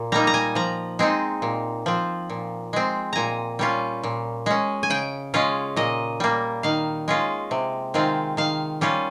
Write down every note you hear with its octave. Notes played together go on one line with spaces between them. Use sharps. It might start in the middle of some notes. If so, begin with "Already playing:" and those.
Already playing: A#2
G3 A#3 D#4 A#5
A#5
G#5
F3 A#5
G#3 C4 D#4
A#2
F3 C4
A#2
G#3 C4
A#2 G#5 A#5
G3 C#4 F4
A#2
G#3 C#4
G#5
C#3 G5
G#3 C#4 F4
A#2 D#5
G3 A#3
D#3 F5
G#3 C#4 F4
C3
D#3 G#3 C4 F4
D#3 F5
G3 C#4 F4